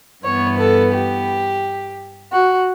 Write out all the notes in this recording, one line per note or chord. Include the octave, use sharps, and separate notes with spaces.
G2 E3 B3 C#5
A4
G4
F#4